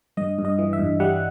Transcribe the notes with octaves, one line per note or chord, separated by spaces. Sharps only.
G2 D#5
G2
D#5
E3
E5
G2
G3 F#5